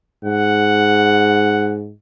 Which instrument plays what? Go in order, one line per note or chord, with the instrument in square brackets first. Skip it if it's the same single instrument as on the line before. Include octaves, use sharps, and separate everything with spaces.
[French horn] G#2 [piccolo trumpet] F#5